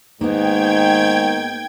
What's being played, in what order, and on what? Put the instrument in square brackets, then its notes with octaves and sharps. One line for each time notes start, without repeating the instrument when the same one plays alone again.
[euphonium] G#2 [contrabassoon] D#3 [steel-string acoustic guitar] A#3 B3 [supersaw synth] G5 G#6